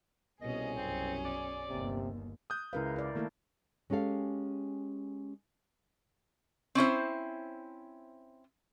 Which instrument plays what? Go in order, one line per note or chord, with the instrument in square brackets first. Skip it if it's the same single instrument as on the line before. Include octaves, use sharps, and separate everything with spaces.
[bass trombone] C2 [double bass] B2 [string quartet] C#4 G#4 [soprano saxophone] D#5
[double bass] B1 F#2 [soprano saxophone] C4
[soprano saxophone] D5
[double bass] G1 D#2 [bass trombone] C3
[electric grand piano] D#6 F#6 G6
[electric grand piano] C#2 C#3 B4 [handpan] E4 A#4 F5
[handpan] E4 D5
[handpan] D#3 E4 A4 [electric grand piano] A3 A#3
[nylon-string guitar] G#3 C#4 G4 A4 F5
[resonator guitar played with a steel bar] C4 C#4 E4 C5